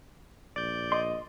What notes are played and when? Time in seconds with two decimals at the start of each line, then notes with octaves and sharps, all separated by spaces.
0.56 A#1 D5 G6
0.92 D#5 C6